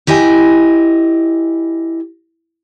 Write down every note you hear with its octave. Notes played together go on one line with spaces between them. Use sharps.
E4 G4 D#5 G#5